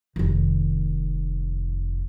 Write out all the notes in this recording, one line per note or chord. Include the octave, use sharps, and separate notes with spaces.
F1 D#3